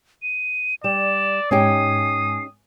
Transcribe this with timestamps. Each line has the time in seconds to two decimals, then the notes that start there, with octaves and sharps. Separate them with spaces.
0.23 D#7
0.84 G3 D5 E7
1.51 G#2 C#4 D#4 G4 G#5 D#6 C7